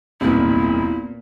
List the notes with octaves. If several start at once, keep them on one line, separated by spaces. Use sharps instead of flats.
E1 C2 F#2 A#2 B3 C4 E4